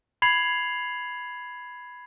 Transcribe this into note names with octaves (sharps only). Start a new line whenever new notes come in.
B5 G#6 C7 F7 F#7